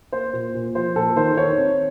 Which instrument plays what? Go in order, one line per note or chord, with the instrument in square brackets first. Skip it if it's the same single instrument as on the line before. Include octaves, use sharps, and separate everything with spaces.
[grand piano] A#3 C5
A#2
A#2
F3 C5
A#2 A4
D#3 C5
D#3 C#5
C4